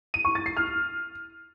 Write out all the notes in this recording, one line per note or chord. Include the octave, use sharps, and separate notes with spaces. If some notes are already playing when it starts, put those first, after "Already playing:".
D#7
C#6
A6
C7
F6